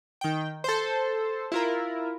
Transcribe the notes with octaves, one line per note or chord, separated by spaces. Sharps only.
D#3 G5
A4 C5
E4 F4 A#4